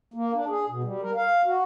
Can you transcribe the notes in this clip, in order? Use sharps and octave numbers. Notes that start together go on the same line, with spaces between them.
A#3
D4
G#4
B2
G3
A#4
F5
F#4